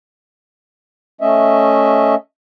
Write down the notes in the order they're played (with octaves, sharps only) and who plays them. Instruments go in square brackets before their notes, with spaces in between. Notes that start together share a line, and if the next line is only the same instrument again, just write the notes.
[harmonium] A3 C#4 D#5 E5